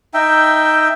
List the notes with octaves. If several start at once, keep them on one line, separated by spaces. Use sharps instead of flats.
D#4 E5 G5